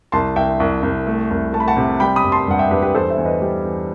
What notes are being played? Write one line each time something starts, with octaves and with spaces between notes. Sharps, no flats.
C2 A5 C6
C2 E5 G5
C2
C2
A3
C2
A3 A5
B5
F#5 A5
C3
G3 G5 B5
B5 D#6
G2
A5 C6
G2 F#5
E5 G5
G2 G4 B4
G4 B4
E2 A4 C5
C5 E5
E2
B4 D#5
G3
E2